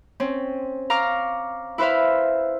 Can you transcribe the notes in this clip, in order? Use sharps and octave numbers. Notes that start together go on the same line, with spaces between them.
C4 C#4
F5 A#5 C#6 D6 F6
E4 B4 C5 E5 F5